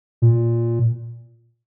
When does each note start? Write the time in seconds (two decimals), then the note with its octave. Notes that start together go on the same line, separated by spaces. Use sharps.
0.22 A#2